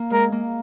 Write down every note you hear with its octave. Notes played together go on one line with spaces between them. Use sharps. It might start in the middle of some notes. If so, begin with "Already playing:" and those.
Already playing: A#3
G#3 A#4
A#3